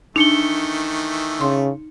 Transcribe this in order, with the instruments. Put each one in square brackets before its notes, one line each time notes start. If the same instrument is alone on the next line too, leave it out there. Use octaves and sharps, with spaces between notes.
[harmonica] D#3 E3 A3 [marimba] D4 [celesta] D#4 C#7 G7
[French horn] C#3 [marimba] C6